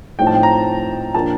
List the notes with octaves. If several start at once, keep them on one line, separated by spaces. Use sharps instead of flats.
A2 F3 C4 D#4 G5
A5
G5
A#5
A#2 F3 A#3 D4 A5